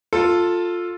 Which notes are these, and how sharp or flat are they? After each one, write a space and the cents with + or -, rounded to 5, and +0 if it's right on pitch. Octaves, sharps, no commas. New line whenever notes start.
F4 +10 A4 +10